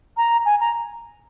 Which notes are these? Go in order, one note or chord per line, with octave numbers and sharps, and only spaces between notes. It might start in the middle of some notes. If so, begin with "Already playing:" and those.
A#5
G#5
A#5